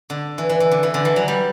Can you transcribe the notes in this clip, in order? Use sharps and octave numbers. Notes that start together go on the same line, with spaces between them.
D3
E3
E3
E3
D3
E3
D3
E3
F#3
G3